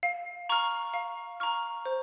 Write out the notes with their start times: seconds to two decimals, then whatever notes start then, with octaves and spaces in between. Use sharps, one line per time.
0.03 F5
0.49 A#5 C#6 F6
0.94 F5
1.40 A#5 C#6 F6
1.85 C5